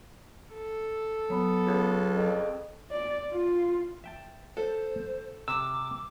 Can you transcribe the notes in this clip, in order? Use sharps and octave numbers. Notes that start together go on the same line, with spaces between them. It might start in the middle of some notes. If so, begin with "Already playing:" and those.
A4
F#3 B3
C#2
F2
D5
F4
E5 G5 A5
A4 C5
C3 D6 E6